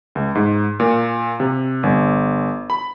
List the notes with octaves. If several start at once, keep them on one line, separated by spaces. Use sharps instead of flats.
C#2
G#2
A#2
C3
G1
B5